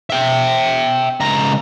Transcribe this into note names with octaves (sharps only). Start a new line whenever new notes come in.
E5 G5
C#2 A#5